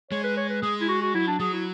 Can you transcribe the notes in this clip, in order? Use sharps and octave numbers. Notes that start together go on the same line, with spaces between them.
G#3 C#5
B4
C#5
B4
G#3 G#4
E4
F#4
F#4
F#3 E4
D4
F#3 G#4
E4